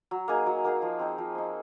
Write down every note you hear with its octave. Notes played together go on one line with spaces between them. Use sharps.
F#3
A#3 D#4 G#4
F#3
A#3 D#4 G#4
F3
C4 D#4
F3
C4 D#4